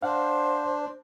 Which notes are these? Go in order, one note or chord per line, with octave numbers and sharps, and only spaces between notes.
D4 C5 F5 F#5